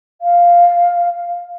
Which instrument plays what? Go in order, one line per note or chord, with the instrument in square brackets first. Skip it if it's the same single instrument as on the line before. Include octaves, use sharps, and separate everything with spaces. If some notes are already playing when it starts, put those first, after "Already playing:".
[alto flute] F5